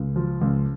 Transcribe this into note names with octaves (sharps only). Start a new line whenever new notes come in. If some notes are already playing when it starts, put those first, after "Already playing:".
Already playing: C#2
F3
C#2